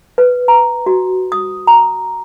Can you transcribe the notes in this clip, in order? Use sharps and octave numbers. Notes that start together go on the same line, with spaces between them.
B4
A#5
F#4
D#6
A#5